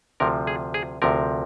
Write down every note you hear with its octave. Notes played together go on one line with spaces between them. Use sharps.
D2 C3 F3 A#4
G#4
G#4
D2 C3 F3 A#4